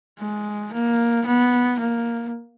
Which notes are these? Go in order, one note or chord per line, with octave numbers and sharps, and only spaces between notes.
G#3
A#3
B3
A#3